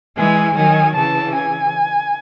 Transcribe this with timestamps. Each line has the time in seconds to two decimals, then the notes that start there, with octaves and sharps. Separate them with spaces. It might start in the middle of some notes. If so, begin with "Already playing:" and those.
0.18 E3 G#3 G#5
0.57 D#3 F#3 G#5
0.96 C#3 E3 A5
1.35 G#5